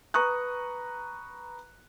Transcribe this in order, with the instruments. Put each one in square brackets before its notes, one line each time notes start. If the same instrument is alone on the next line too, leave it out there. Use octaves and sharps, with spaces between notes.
[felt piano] B4 A#5 C#6 D#6 F#6